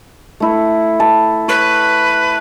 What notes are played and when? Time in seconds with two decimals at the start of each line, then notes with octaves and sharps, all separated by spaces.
0.40 A3 E4
1.00 A5
1.48 B4 C#5